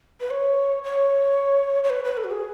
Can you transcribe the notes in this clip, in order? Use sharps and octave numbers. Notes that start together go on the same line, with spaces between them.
B4
C#5
C#5
C#5
B4
B4
A4
F#4
G#4